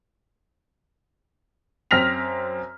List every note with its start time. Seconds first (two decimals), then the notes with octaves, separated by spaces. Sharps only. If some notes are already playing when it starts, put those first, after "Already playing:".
1.91 F#2 C4 F6 A#6 B6 F7